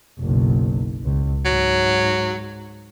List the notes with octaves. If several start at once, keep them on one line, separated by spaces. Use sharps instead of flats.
F#1 B1
C#2
G#2 F#3